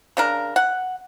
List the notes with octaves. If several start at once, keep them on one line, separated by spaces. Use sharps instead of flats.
C#3 D4 A#4
F#5